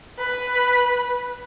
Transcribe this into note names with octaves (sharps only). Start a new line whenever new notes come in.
B4